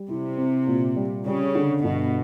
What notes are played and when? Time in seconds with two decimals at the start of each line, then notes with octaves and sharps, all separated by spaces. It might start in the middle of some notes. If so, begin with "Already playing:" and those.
Already playing: G3
0.09 C3 E4
0.38 C4
0.67 A#2
0.96 G3
1.26 C#3 G3
1.55 D3
1.84 G1 B2